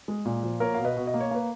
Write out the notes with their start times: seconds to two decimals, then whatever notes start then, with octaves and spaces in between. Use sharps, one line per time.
0.08 G#3
0.25 A#2
0.43 F3
0.60 A#3 A#4 C#5
0.74 B2 F5
0.85 B4 D#5
0.97 B2
1.07 D#5
1.14 A#3
1.21 C#5
1.31 A#3 B4